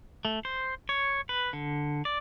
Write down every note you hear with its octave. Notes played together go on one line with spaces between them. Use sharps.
A3
C5
C#5
B4
D3
D5